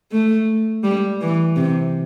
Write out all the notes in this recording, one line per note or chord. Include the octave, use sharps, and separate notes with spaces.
A3
G3
E3
C3